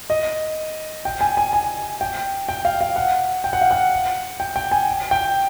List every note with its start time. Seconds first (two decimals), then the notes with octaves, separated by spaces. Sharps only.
0.10 D#5
1.05 G5
1.21 G#5
1.37 G#5
1.53 G#5
2.01 G5
2.49 G5
2.65 F5
2.81 F5
2.96 F#5
3.44 G5
3.53 F#5
3.61 F5
3.71 F#5
4.40 G5
4.56 G5
4.72 G#5
5.11 G5